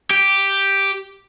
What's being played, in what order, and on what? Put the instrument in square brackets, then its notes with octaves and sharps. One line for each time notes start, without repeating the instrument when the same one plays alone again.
[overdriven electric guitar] G4